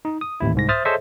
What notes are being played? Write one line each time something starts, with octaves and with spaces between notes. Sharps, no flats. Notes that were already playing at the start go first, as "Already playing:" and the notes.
D#4
D#6
A1 D#2 E4
C2 G#2 A#6
C5 E5 D#6 F6 A6
G#4 A4 C5 C#5 D#5 E5